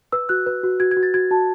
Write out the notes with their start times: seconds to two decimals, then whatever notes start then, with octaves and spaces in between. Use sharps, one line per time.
0.12 B4 E6
0.29 F#4 F#6
0.46 B4
0.63 F#4
0.80 F#4 G#6
0.91 G#6
0.97 F#4
1.03 A6
1.14 F#4 G#6
1.31 F#4 A5